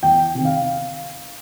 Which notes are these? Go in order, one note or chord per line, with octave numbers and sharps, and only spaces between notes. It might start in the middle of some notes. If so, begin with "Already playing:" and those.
E2 G5
C3 D#3
F5